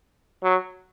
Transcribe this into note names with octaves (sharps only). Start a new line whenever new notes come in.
F#3